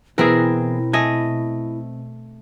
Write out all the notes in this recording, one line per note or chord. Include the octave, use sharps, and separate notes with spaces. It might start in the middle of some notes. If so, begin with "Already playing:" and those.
B2 E3 B3 C4 E4 G#4 A#4
A3 D#5 G#5